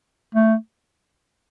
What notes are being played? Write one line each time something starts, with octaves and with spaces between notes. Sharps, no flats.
A3